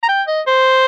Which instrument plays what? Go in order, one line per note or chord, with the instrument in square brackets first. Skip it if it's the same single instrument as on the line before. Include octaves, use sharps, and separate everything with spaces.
[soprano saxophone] A#5
G5
D#5
C5